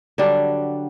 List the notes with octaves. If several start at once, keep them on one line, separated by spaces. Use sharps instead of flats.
D3 F#3 G3 D4